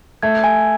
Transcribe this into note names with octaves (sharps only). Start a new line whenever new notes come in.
A3 G#6
G#5